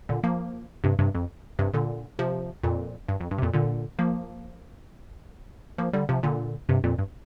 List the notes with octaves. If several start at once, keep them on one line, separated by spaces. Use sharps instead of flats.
A#2 D3
F3 A#3
G2 C3
G2 C3
F2
G2 C3
A#2 D3
C3 F3
F2 A#2
G2
F2
G2
C3
F2 A#2
A#2 D3
F3 A#3
F3 A#3
D3 G3
C3 F3
A#2 D3
G2 C3
F2 A#2
G2